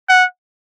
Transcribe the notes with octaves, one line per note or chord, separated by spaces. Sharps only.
F#5